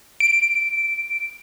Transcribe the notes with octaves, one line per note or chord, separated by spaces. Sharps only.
D7